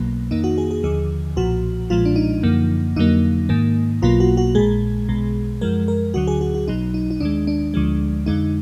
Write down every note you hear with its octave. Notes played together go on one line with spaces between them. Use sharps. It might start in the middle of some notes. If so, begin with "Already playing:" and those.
Already playing: B1 B2 F#3 A#3
F2 D#3 A#3 D#4
F#4
G#4
G#4
D#2 D3 F3 G#4
B1 A#2 F3 F#4
B1 A#2 F3 G#3 F4
D4
D#4
F#2 D3 F3 A#3
F2 D3 F#3 A#3 D#4
G#2 D#3 A#3
B1 B2 F#3 A#3 F4
F#4
F#4
A#1 A#2 G#3 G#4
B1 B2 G#3
F#2 F3 G#3 A#4
A#4
D2 D3 F#3 F#4
G#4
F#4
F#4
B1 B2 F#3 D#4
D#4
D#4
D#2 D#3 G#3 D4
D4
D2 D3 F3 G#3
F2 D3 G#3 D#4